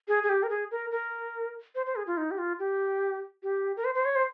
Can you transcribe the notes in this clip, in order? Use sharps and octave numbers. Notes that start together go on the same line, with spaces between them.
G#4
G#4
G4
A#4
G#4
A#4
A#4
C5
C5
G#4
F4
D#4
G4
F4
G4
G4
A#4
C5
C5
C#5
C5